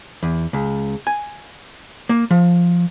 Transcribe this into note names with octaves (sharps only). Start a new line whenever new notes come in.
E2
C#2
G#5
A#3
F3